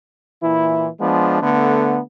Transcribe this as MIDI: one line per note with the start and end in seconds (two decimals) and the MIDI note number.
0.42 0.87 46
0.42 0.87 52
0.42 0.87 64
0.99 1.38 53
0.99 1.38 56
0.99 1.38 59
0.99 1.38 62
1.42 1.99 50
1.42 1.99 57
1.42 1.99 59